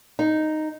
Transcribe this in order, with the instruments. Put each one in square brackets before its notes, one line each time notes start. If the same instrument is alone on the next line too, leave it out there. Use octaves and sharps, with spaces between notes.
[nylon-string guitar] D#4